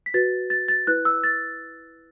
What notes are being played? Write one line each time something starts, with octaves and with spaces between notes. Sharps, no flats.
B6
F#4 B4 A6
A6
A6
E4 B4 F#6
E6
A6